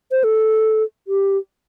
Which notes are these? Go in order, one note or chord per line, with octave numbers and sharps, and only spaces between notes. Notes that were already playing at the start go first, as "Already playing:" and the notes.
C5
A4
G4